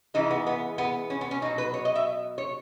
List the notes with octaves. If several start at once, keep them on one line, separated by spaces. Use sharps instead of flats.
C#3 E3 G#3 D#4
B3
B3
B3
C#4
B3
C#4
B2 F#3 D#4
B4
C#5
D#5
E5
C#5